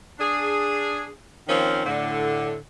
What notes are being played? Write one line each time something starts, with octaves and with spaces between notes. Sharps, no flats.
D4 G#4
D#3 F3 A#3 C4 C#4
A2 D3